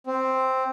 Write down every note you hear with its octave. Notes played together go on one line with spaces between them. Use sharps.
C4